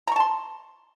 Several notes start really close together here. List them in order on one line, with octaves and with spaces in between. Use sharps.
A#5 C#6 A5 C6